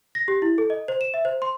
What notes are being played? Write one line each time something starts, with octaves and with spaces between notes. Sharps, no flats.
A#6
G4
E4
A4
D#5
C5
E7
E5
C5
C6